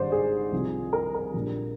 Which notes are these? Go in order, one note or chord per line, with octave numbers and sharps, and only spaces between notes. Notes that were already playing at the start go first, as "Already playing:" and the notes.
Already playing: G#1 G#2 G3 D4 C5 D5
G#4
C2 C3 F3
A#4
A#4
A#1 A#2 G3 D4